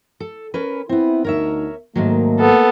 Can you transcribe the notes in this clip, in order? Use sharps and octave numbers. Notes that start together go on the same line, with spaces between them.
A4
C#4 A#4 B4
B3 C4 E4
D2 D#4 A#4 C#5 E5
G#2 D#3 F#3 A3 A#3
B3 A4